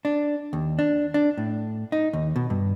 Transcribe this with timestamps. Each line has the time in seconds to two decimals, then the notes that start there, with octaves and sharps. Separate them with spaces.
0.05 D4
0.53 D#2
0.79 D4
1.14 D4
1.38 A2
1.92 D#4
2.13 D#2
2.36 B2
2.50 G2